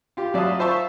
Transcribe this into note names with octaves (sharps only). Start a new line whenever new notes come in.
F4 G4
F#3 D5 E5 F5 A5 D#6
F4 C5 E5 A5 C#6 E6